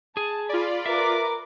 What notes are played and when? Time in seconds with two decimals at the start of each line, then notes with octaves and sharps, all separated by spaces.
0.17 G#4 A5
0.49 F4 D5 B5
0.86 A#4 B4 E5 D6